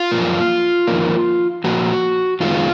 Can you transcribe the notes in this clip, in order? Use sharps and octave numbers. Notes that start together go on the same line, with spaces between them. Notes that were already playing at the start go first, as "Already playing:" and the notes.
Already playing: F4
F#2 F3 A#3
F2 D#3 A#3
A#2 F3 A#3 F#4
F#2 D#3 G#3 B3 F4